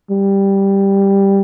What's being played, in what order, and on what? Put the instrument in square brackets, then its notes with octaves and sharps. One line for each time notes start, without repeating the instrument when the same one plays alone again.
[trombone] G3